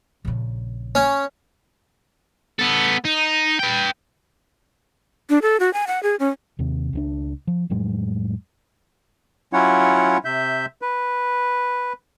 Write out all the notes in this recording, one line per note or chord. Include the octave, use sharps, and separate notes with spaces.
A#1 C#3
C#4
B3 A4
D#4
B4 G5
D4
A4
F#4
G#5
F#5
G#4
C#4
D#2 C3
C#2 F3 D4
F3
F2 A2 F#3 G#3
F#3 C#4 E4 F4 C#5 F#5
C3 E5 G6
B4